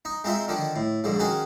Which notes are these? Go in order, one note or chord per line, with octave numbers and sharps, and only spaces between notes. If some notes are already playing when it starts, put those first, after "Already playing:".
D#4
G#3 C4 D#4 F4 E5
D3 D#3 F3 D4
A2
A#1 G#2 D3
D#3 C#4 F#4 G#4